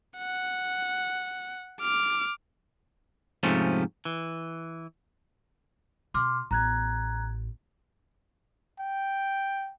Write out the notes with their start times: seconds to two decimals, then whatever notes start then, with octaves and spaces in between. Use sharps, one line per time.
0.18 F#5
1.81 D6 F6
3.43 F2 G#2 C3 F3 A3 C#4
4.05 E3
6.14 B2 C6 D6 F6
6.51 A1 B3 A#5 F#6 G#6
8.79 G5